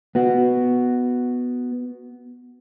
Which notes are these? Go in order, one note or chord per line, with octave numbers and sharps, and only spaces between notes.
B3 F#4